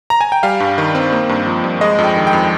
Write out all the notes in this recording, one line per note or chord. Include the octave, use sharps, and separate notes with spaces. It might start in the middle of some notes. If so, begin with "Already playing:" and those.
A#5
G#5
G5
G3 F5
G2
D#3
C4
A#3
G2
F3
G2
G#3 D#5
F2
G5
D#3
G5
F2